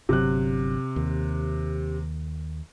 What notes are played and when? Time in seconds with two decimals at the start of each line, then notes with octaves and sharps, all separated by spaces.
0.09 G1 C3 F#3 F#6
0.96 D#2